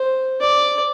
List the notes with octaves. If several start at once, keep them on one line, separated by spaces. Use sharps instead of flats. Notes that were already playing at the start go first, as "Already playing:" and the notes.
Already playing: C5
D5